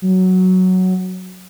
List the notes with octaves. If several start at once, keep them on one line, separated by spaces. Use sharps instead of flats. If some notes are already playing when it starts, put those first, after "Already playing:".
F#3